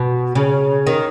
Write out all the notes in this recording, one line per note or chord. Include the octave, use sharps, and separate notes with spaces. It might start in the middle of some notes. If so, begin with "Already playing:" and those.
Already playing: B2
C#3
D#3